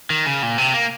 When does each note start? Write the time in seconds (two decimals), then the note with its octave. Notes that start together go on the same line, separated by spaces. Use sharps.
0.10 D#3
0.26 C#3
0.43 A#2
0.58 C3
0.74 A#3